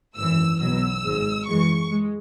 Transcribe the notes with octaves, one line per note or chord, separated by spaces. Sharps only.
G#1 F#2 E3 E6
B1 B2 F#3 E6
G#1 G#2 G#3
F#2 E3 G#3 C#6
G#3